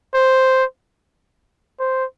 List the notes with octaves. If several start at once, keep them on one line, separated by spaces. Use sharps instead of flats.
C5
C5